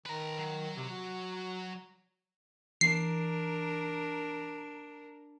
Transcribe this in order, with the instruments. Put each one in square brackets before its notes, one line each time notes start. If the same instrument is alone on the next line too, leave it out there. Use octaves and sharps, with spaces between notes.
[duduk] D#3 [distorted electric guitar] B4 A#5
[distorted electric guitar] F#3
[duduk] C3
F#4
[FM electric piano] E3 [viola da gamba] D4 A#4 [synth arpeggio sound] C7